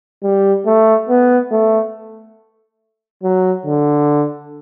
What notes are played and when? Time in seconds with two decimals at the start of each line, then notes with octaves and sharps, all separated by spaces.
0.24 G3
0.66 A3
1.09 B3
1.52 A3
3.23 F#3
3.66 D3